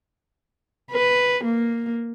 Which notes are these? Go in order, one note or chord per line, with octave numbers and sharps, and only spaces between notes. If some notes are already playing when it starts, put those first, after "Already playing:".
B4
A#3